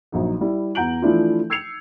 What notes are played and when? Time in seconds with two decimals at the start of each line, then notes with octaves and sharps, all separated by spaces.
0.12 A#1 F#3 D#4
0.41 G3 E4
0.75 E2 F#5 A#5 G6 D7 F#7
1.02 E3 F3 A3 D4 E4 F4
1.50 E6 G#6 C7 C#7 F7